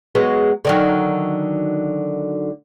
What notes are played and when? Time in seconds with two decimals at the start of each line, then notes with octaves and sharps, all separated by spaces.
0.15 F#3 G#3 B3
0.65 D3 D#3 F#3